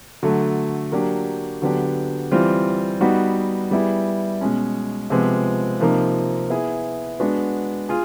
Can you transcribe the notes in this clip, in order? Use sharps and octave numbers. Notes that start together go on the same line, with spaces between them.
D3 F#3 A3
F#3 A#3 D4 G4
D3 F#3 B3 D4 G4
E3 G3 C4 F4
G3 B3 D#4 F#4 B4
G3 B3 E4 G#4
B2 G#3 C#4
C3 F3 G#3 B3
C3 F3 A#3 D#4
B3 E4 G#4
G#3 B3 D4 F#4
F4 G#4